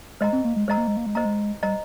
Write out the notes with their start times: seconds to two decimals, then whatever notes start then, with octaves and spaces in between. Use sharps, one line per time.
0.21 G#3 C5 D#5 A#5
0.33 C4
0.44 A#3
0.56 G#3
0.68 G#3 C5 D#5 A#5
0.77 A#3
0.88 G#3
0.97 A#3
1.06 G#3
1.15 A#3 C5 D#5 A#5
1.25 G#3
1.63 G3 C5 D#5 A#5